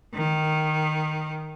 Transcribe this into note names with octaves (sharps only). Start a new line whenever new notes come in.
D#3